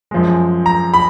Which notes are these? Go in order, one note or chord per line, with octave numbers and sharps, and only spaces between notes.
F#2 F3 G#3
A#5
B5